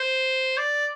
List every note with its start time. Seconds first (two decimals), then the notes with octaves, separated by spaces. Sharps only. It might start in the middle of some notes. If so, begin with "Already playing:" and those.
Already playing: C5
0.58 D5